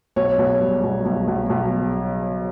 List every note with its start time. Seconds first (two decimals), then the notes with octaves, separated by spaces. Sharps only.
0.16 B1 C#5
0.39 B1
0.61 G3
0.83 B1
1.05 B1
1.28 B1
1.50 B1